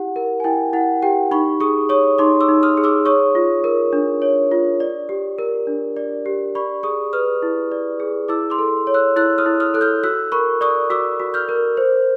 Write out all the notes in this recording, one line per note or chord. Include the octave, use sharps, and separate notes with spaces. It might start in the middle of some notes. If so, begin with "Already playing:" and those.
Already playing: E4 G4 F#5
A#4
G#5
E4 G5
E4 F#5
G4 G5
D#4 B5 C#6
G#4 C#6 D#6
C#5 C#6 D#6
D#4 C6 D6
D6 E6
D#4
D#6 F6
G#4
D6 E6
C#5 C#6 D#6
F4
A#4
D4
C#5
F4
D5
G4
A#4
D4
D5
G4
D5 B5 C#6
G#4 C#6 D#6
B4 D#6 F6
E4
D5
G#4
E4 D6 E6
C6 D6
A4
C#5
E6 F#6
E4 E6 F#6
D#6 F6
E4
D#6 F6
A4 F#6
F6 G6
F#4 E6 F#6
A#4 B5 C#6
D5 C#6 D#6
F#4 D6 E6
F#4
F6 G6
A#4
C5